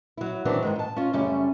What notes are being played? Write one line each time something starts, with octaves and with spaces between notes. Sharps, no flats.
F#3 E4
D#3 E3 F#3 B3 C4 D4
G#2 D#3 G#3
G5 A5
C#4 F4
F#2 C#3 G3 A3 C#4